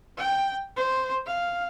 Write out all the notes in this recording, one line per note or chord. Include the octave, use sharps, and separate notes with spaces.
G5
C5
F5